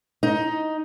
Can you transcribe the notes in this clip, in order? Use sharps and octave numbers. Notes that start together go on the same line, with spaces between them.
D#4